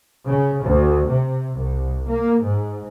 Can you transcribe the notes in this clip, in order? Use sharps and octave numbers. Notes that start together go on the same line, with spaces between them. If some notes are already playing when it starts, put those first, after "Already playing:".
C#3
D2
C3
C2
A#3
G#2